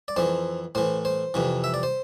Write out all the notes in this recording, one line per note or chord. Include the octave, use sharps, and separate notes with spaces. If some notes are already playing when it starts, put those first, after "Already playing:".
D5
F2 E3 C5
A2 E3 C5
C5
F2 C3 E3
E5
D5
C5